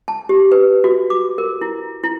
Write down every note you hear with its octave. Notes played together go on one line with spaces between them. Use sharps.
A5
G4
B4
F#4
D6
A#4
E4
E4